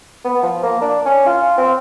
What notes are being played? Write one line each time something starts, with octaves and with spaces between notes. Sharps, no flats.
B3
F3
A#3
D4
C#4
F4
C4